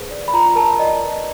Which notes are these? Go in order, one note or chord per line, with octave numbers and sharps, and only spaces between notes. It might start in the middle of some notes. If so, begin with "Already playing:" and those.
Already playing: G#4 B4 C5
D5
B5
F4 A#5
A#4 A5
D5 D#5
B4